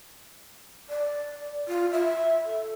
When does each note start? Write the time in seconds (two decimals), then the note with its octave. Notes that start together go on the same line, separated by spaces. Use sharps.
0.90 D5
1.68 F4
1.92 E5
2.46 A4